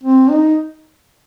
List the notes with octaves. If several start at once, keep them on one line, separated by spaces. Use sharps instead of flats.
C4
D#4